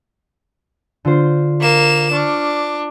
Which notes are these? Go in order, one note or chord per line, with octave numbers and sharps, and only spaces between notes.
D3 F4 C5
A#3 E7
D4 C#6 D6 F6